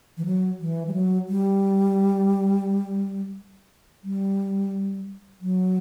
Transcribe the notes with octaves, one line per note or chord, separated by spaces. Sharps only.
E3
F#3
E3
G3
F#3
G3
G3
F#3